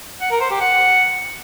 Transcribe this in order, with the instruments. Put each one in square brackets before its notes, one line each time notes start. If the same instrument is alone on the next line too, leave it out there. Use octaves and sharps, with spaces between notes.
[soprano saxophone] F#5
A#4
C5
G4
F#5